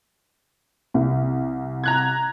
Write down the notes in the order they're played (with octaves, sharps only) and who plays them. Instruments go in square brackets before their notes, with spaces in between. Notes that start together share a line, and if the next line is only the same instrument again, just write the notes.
[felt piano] C2
[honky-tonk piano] A#5 F#6 G#6